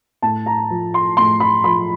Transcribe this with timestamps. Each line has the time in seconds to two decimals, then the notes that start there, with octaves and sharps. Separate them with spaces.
0.22 A2 A5
0.46 A#5
0.70 F3
0.94 C6
1.17 A2 C6
1.40 B5
1.64 F3 B5